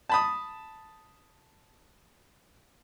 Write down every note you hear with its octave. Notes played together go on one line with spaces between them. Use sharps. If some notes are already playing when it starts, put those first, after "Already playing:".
A5 B5 D#6